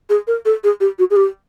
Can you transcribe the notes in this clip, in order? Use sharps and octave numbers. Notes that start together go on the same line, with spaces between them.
G#4
A#4
A4
G#4
G4
F#4
G#4
G4